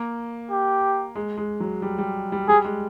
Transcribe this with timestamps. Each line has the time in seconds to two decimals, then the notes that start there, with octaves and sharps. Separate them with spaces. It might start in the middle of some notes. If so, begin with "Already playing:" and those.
Already playing: A#3
0.50 G4
1.16 G#3
1.38 G#3
1.60 F#3
1.82 G3
1.98 G3
2.32 G3
2.48 G3 G#4
2.65 G#3